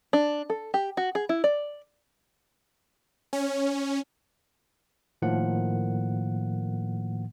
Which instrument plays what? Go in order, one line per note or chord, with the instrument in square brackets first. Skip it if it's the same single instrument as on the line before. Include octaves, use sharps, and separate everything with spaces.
[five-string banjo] D4
A4
G4
F#4
G#4
E4
D5
[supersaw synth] C#4
[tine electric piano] A2 D#3 F3 A#3 F#5